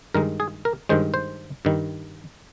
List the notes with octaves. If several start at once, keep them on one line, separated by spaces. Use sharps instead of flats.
G2 D#3 G#3 A#4
G#4
A#4
G2 D#3 G#3 C5
C5
G2 D#3 G3